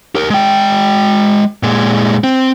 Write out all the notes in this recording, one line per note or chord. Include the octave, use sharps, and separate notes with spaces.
G4 A#4
G#3 G5
A#2 G#3
C4